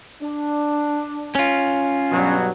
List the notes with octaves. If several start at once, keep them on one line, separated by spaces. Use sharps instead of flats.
D4
C#4 F4
G2 B2 F#3